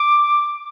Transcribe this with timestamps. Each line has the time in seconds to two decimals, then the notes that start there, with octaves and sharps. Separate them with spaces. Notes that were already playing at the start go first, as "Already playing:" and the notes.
Already playing: D6